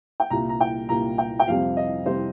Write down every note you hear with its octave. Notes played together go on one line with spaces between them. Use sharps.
G5
C2 A#2 G3 A#3 A#5
A#5
G5
C2 A#2 G3 A#3 A#5
G5
G5
F2 C3 G3 F5
D#5
C3 G3 C5